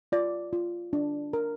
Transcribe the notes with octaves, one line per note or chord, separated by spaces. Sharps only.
F4 D5
F4
D4
A#4